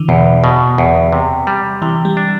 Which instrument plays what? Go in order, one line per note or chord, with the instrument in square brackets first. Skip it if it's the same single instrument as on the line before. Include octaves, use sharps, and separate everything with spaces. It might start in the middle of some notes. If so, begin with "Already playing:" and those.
Already playing: [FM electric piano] D3 E3
[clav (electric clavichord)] E2 [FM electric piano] B2
[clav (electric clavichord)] B2
E2
C3
G3
[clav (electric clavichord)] C3 [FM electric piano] E3
[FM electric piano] G3
[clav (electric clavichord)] D4